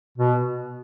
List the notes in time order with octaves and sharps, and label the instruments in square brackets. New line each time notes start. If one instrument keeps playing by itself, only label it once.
[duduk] B2